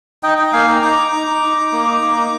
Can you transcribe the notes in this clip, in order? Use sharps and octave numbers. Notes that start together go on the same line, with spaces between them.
D#4 D#5 G5
D#4 D#5 G5
A#3 F5 G#5
D#4 G5 A#5
D#4 A#5 D6
D#4
D#4
D#4
D#4
D#4
A#3
D#4
A#3
D#4